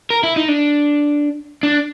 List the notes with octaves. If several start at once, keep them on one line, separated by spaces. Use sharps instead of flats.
A#4
E4
D#4
D4
D4